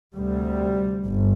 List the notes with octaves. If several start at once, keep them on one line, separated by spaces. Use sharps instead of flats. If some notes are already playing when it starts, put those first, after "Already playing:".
D2 C3 G3
G1